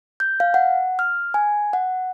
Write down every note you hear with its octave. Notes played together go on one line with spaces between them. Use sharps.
G6
F5
F#5
F6
G#5
F#5